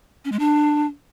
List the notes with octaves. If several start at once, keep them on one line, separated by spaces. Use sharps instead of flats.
C#4
G#3
D4